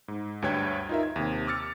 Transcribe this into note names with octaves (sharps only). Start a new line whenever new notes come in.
G#2
D2 G2 B4 C#5 G5 G#6
D#4 F4 A#4 E5
G#6
D#2 C3
D6 E6 F6 A6 C#7